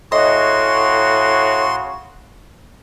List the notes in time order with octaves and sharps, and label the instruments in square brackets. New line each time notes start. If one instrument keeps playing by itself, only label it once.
[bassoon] A2 [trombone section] C#3 F#4 [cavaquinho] D#5 [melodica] C6